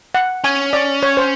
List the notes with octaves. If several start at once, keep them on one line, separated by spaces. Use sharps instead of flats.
F#5
C#4 G#5
D5
C#5
C5